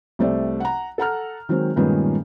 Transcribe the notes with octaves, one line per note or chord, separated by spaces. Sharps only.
C2 C3 A3 C5 D5
F#5 A#5
A4 F#5 A#5 F6
D#3 F#3 G#3 C4
G2 A#2 D#3 G#3 B3 C#4